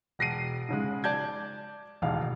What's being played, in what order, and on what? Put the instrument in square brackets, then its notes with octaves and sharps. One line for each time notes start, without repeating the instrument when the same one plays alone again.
[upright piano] E1 A#6 C7 D#7
G#2 C#3 G#3
D5 A5 G6 G#6
E1 A1 D#2 F5